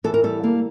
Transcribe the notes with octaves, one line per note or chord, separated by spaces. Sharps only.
E3 A4
A#4
G3 A4
A#3